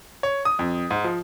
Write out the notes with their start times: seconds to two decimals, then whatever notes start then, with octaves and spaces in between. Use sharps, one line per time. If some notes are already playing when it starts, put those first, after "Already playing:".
0.23 C#5
0.45 D#6
0.59 F2
0.91 G#2
1.04 F3